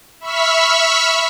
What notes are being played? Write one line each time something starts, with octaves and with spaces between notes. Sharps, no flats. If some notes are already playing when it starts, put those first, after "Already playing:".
E5 B5 C#6 E6 F6 B6